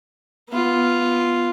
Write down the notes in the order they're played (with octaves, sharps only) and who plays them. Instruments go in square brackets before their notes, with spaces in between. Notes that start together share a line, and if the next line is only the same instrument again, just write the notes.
[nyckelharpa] B3 F4